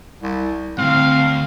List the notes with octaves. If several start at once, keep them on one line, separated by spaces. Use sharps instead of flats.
C2
D2 G2 C4 F5